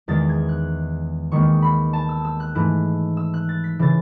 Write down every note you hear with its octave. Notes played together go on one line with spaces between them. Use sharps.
E2 D#3 G#3 A6
G#6
F#6
D#2 D#3 G#3 B3 C#6
B5
A5
E6
E6
F#6
G#2 E3 A3 E4
E6
F#6
A6
B6
C#3 E3 A6